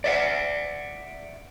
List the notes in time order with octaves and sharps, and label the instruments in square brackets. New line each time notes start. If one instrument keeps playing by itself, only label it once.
[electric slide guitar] D5 E5 F#5